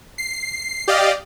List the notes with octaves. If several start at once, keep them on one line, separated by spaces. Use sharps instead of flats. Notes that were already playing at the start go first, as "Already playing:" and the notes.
C7
G4 D5 D#5 F5